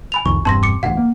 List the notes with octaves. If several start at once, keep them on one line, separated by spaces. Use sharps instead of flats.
G#5 B5 F7
C2 F2 D#3 C#6
E1 G2 C4 A5 C6 A#6
D6 C#7
A1 D2 B2 F5 F#5
A#3